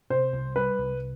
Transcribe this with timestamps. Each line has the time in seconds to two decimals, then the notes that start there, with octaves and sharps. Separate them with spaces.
0.10 C3 C5
0.33 C2
0.56 G3 B4
0.79 C2